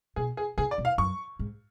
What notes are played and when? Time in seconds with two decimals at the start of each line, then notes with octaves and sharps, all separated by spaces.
0.16 B2 G#4
0.37 G#4
0.58 C#3 G#4
0.71 D5
0.78 B2
0.85 F5
0.98 F#2 C#6
1.39 G#2